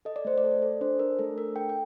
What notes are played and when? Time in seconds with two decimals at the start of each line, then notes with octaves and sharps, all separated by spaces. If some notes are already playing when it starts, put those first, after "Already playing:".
0.05 A4 D#5
0.16 D5
0.25 A3 C5
0.38 D5
0.44 A4
0.62 A4
0.81 D4 C5
0.99 D4 A#4
1.19 A3 A4
1.37 D4 A#4
1.56 A4 G5
1.69 G5